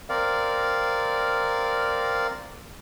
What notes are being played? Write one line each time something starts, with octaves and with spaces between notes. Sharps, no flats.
C4 A#4 D5 F5